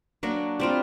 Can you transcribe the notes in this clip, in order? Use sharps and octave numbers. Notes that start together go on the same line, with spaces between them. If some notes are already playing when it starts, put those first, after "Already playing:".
F#3 A#3 D4 F#4
G3 C4 F4